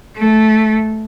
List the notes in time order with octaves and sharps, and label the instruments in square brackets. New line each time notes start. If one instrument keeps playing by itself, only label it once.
[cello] A3